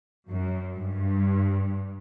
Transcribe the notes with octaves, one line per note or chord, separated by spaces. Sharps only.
F#2
G2